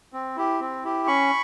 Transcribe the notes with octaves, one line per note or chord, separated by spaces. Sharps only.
C4
E4 G4
C4
E4 G4
C#4 B5 C#6